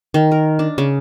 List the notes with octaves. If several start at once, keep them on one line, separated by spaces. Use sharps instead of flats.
D#3
A#4
D4
C#3